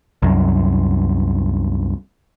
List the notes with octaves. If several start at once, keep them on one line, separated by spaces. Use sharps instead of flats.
C2 F#2